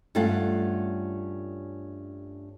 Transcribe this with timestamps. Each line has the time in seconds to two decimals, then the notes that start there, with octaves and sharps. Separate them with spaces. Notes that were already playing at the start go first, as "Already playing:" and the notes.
0.15 G2 A3 C#4 F4 F#5 A5